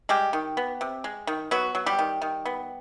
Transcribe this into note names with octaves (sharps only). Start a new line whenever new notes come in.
G3 G#3 G4
D#3
B3
C3
G#3
D#3
F#3 B3 F#4
F#3
G3 G4
D#3
D#3
B3